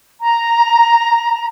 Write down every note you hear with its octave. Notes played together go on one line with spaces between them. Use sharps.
A#5